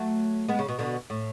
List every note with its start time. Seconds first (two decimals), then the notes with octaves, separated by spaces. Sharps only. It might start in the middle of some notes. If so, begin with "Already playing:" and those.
Already playing: F#3 A3
0.48 G#3 B3
0.59 C#3
0.69 B2
0.79 B2 D3
1.10 A2